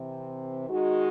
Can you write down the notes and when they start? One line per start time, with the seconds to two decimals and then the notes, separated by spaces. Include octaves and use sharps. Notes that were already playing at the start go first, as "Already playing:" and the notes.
Already playing: C3 E3 C4
0.69 D#3 G#3 D#4 F#4